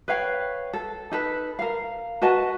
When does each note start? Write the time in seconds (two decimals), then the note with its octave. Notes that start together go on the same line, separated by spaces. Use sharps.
0.08 B4 C#5 F5 G5
0.73 A4
1.11 D#4 A4 B4
1.59 A#4 F5
2.22 F#4 B4 D#5 A5